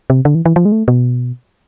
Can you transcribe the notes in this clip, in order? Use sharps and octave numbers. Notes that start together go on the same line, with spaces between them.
C3
D3
E3
E3
F3
G#3
A3
B2